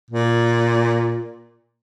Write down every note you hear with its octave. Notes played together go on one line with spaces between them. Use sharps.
A#2